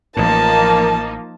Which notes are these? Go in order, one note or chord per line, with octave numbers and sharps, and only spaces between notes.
A1 A2 F3 A#3 D#4 A#4 A5